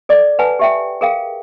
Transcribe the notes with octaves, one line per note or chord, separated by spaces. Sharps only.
A4 D5 D6
B4 F#5 G#5 A5
G4 E5 G5
G#4 A#4 F5 G5